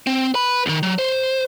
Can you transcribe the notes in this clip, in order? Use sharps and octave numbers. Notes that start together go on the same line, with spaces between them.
C4
B4 B5
C#2 D#3
F#3
C5